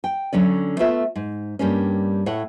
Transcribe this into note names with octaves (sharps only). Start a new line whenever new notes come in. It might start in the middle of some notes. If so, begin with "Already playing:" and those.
G5
D3 F#3 C#4 D5
A3 B3 F4 E5
G#2
G2 G3 A#3 C#4
A2 C#5 F#5